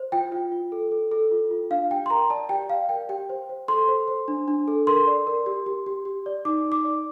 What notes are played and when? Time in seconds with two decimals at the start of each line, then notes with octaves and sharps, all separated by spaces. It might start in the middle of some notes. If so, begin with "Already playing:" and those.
Already playing: C5
0.12 F4 G5
0.32 F4
0.52 F4
0.72 A4
0.92 A4
1.11 A4
1.31 F4
1.51 F4
1.70 D4 F5
1.91 G4 G5
2.06 C6
2.10 A#4 A#5
2.30 D5 A5
2.49 G4 G5
2.70 D5 F5
2.89 A#4 G5
3.09 G4 G5
3.29 C5
3.49 C5
3.68 A4 C6
3.88 C5
4.08 C5
4.28 D4
4.48 D4
4.68 A4
4.87 A#4 C6
5.07 D5
5.27 A#4
5.46 G4
5.66 G4
5.86 G4
6.05 G4
6.26 D5
6.45 D#4 D6
6.65 D#4
6.72 D6
6.84 D5